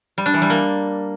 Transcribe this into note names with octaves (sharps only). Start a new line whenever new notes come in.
G3
D4
E3
G3
A#3